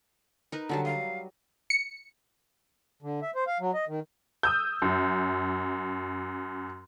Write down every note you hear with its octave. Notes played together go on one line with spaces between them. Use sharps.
D#4 A#4 B4
D3 F#3 G3 A5
D#5 F5
C#7
D3
E5
C5
F5
F#3
D#5
D#3
D#6 E6 G6
F#2